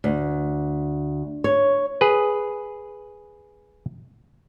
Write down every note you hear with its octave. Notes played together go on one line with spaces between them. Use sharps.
D2
C#5
G#4 B4